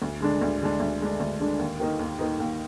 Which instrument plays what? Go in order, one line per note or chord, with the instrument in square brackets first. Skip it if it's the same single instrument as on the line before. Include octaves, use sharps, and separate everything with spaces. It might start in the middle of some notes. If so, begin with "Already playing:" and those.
[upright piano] D2
D3 G#3 D4
D2
D3 G#3 D4
D2
D3 G#3 D4
D2
D3 G#3 D4
D#2
D#3 A#3 D#4
D#2
D#3 A#3 D#4
D#2